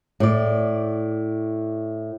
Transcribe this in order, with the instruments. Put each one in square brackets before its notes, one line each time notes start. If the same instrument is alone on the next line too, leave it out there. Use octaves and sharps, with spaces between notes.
[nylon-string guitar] A2 D5